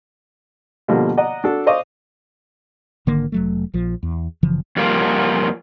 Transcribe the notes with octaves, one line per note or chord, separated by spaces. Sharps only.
B2 D3 F3 G3 A#3
D5 D#5 F#5 A#5
D4 F#4 A4
C5 D5 D#5 F5 C#6 D6
G#1 D3 D#3 A#3
F1 F#3 A3
A#1 F3
E2
F#1 C#3 E3 F3
F2 G3 A#3 F4